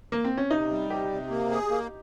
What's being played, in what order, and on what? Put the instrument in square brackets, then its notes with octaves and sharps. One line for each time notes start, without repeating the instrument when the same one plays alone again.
[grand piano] A#3
C4
C#4
[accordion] C3 [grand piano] D#4
[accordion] G3
[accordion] C3 [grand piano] G4
[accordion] C3
A#3
G#4
A#3